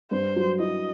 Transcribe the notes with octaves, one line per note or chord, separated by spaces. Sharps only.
G2 C5
F#3
E4 D#5